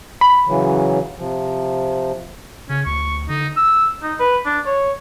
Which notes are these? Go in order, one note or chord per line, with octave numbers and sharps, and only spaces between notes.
B5
C#3 E3 F#3
C3 F3
C#3 C#4
D2 C#6
D3 D#4
E6
D#4
B4
D4
C#5